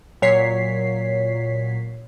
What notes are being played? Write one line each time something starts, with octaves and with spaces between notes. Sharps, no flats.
A#2 F#3 C#5 B6 C7